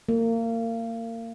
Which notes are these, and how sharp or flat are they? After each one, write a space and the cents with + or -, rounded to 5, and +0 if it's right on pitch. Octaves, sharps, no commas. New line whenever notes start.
A#3 -30